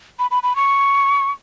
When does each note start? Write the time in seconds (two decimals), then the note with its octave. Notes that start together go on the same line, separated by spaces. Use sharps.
0.19 B5
0.31 B5
0.43 B5
0.56 C#6